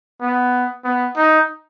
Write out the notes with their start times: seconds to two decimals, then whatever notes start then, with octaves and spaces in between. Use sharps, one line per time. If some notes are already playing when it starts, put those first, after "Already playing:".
0.21 B3
0.84 B3
1.16 D#4